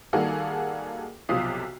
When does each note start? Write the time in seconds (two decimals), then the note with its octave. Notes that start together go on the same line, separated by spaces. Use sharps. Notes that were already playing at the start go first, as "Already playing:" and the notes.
0.13 D#3 G3 A#3 F#4 G#4 A4
1.29 B1 C3 F3 F4 D#6 C7